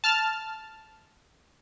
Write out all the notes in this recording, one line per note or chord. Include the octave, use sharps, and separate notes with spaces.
A5 F6